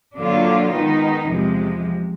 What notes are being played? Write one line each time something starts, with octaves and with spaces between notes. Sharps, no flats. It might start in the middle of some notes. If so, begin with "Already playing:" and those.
D3 F#3 A#3 D4 F4
D#3 G#3 B3 D#4
E2 C3 F3 G#3